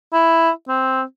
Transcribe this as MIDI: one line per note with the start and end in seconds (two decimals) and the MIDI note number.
0.13 0.50 64
0.68 1.03 60